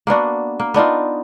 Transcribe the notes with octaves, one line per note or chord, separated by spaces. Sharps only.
A#3 B3 D4 F#4
A#3
B3 D4 D#4 F4